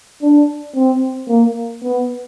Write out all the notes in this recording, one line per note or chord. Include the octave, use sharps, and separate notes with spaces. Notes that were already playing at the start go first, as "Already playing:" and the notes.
D4
C4
A#3
B3